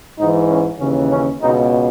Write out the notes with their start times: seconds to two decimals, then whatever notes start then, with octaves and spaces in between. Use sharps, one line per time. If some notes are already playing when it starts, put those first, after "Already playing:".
0.18 G#2 E3 D#4
0.49 C#4
0.80 D#2 C#3 E3 C#4
1.11 C#4
1.42 C#2 B2 D#4